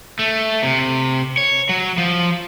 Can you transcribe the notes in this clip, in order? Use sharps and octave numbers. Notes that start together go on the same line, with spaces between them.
A3
C3
C#5
F#3
F3